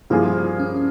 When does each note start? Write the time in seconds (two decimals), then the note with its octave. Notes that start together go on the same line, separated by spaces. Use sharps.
0.10 G2 F3 A#3 E4 F4 G#4
0.59 C#4